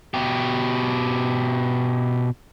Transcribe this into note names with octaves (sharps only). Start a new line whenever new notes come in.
B2 G4